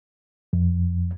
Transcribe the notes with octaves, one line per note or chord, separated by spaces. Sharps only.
F2